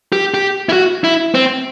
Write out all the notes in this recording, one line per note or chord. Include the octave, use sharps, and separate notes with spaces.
G4
G4
E4
F#4
E4
C4